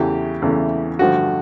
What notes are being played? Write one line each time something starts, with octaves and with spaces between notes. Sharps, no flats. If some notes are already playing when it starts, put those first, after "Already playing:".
Already playing: E2 C#3 E3 A3 G4
E2 C#3 E3 A3
G2 D3 F3 A3 F#4